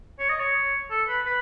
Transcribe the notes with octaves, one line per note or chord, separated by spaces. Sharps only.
C#5
D#5
C#5
A4
B4
B4